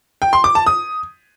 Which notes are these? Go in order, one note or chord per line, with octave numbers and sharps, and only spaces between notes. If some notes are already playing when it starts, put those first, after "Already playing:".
G5
C6
D6
A5
D#6